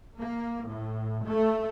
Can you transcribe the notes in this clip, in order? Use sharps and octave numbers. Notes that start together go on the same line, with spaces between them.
A#3
A2
A3